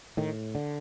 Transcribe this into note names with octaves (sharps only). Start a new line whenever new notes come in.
A2 D#3
D3